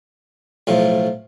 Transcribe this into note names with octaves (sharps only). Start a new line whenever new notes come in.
B1 A2 F3